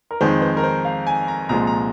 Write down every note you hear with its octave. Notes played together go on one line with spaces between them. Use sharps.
A#4
F2 D#3 G#3 C5
C5
A#4
C5
F5
G#5
A#5
C2 A#2 F3 G#3 A#5
A#5